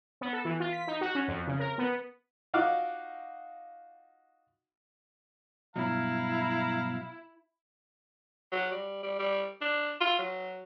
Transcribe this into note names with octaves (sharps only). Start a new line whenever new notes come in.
B3
A4
E3
F4
B6
D#4
F#4
C#4
F2
C#3
A#4
B3
D#4 F4 F#4 F5 D6
G2 B2 F#3 E4 F5 A#5
F#3
G3
G3
G3
D4
F4
F#3